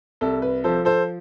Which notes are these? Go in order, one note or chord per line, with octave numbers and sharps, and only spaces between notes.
C2 A4
B4
F3 A4 C5
A4 C5